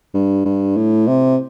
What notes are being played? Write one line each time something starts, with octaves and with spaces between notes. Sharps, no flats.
G2
G2
A2
C3